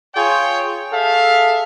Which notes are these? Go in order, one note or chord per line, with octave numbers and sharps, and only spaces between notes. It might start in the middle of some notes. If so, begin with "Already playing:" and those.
F4 G#4 C#5 G5
G#4 A4 E5 F5